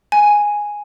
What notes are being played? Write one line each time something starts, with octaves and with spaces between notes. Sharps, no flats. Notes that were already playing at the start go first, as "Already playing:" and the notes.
G#5